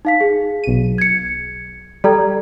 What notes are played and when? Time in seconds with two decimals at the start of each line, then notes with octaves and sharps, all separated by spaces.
0.05 D#4 F5 B6
0.21 G#4
0.64 B1 D#7
0.98 G#6 C#7
2.04 G3 A4 A#5 G#6